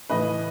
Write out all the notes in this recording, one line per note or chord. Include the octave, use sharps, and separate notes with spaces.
A2 E3 B4 D#5